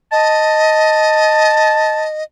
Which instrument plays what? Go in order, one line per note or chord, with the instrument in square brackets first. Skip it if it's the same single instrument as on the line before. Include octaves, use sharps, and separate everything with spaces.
[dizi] D#5 [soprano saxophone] A5